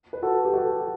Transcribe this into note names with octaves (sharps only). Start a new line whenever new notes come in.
B4
F#4 A4
G4
F#4 A4